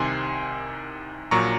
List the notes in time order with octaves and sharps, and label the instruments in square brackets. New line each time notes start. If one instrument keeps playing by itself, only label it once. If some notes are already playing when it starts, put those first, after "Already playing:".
Already playing: [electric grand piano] C2 C3 D#3 G#5 C6
A#1 A#2 F#3 A#5 C#6